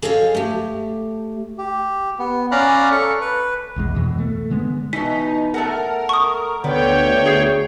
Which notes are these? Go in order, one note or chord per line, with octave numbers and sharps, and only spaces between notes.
G#4 A4 C#5 D#5 F5
A3 G4
G4
B3
C#4 D5 F5 A#5 B5 F#6
A4 C#6
B4
B1 E2 G#3
F2 B2 E3
A3
D3 G#3 B3
B2 E3 D#4 B6
A3 A4 A#4 F#5
C#6 D#6
D2 D3 G3 B3 C#5 G5
G#4 G#6 C7